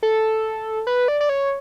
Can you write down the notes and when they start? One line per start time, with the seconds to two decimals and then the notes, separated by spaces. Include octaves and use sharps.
0.03 A4
0.87 B4
1.08 D5
1.21 D5
1.29 C#5